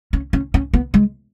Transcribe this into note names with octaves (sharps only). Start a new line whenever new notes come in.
C#4
C#4
C#4
B3
G#3